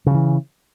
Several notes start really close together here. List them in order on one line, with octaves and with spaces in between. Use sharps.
C#3 F3 E3